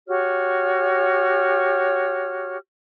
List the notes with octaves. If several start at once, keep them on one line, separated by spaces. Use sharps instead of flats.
F#4 G4 C#5 F6